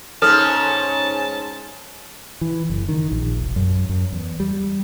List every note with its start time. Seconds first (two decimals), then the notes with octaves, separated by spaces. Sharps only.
0.22 G#2 C#4 A4 A5 F6
2.41 E3
2.70 F#1
2.89 D#3
3.11 A#1
3.39 E1
3.56 F#2
3.89 F#2
4.12 E2
4.40 G3